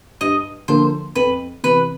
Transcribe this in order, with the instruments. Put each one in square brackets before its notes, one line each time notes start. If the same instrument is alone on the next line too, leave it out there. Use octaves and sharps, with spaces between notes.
[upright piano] G2 [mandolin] D#5
[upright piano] D3 F3 A#3 [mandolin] C5
[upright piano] F2 [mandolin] B4
[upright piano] C3 E3 [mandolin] B4